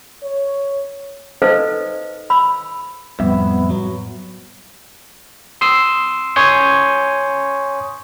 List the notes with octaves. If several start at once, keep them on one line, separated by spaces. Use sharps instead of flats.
C#5
D#4 A4 B4 C5 D#5 F5
B5 E6
F2 A2 G3 B3 E5
F#3
C6 D#6 E6 C7
C#5 G#5 C6 C#6 D#6 G6